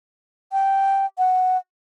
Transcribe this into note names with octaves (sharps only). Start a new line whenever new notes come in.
G5
F#5